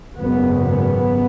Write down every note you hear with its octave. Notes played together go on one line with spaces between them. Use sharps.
G#1 F#2 C#3 B3
B3